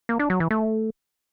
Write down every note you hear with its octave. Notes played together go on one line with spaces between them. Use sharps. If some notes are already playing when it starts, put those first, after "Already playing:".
A#3
D4
F#3
E3
A3